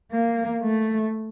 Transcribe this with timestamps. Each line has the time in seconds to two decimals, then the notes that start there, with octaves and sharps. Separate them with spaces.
0.11 A#3
0.62 A3